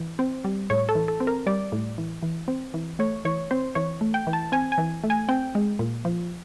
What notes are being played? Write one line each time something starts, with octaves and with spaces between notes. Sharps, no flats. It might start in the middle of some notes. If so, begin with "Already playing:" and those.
Already playing: E3
C4
G3
A2 C#5
A4
E3
A4
C4
A#4
G3 D5
A2
E3
E3
C4
E3
A3 C#5
E3 C#5
C4 C5
E3 C#5
A3
G5
E3
A5
C4 G#5
G#5
E3
A3
G#5
C4 G5
G#3
A#2
F3